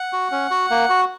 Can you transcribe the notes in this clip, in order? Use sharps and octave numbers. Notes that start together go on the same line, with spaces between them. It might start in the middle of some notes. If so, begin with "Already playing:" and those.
Already playing: F#5
F#4
C#4
F#4
A#3
F#4